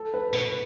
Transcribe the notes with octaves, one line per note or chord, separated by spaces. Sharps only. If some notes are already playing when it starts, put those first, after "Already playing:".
Already playing: A4
B4
B2 B4